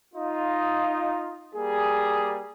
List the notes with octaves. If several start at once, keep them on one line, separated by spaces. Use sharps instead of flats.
D#4 F4
G3 A#3 G#4